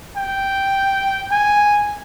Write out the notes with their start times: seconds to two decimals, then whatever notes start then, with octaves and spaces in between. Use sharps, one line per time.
0.16 G5
1.31 G#5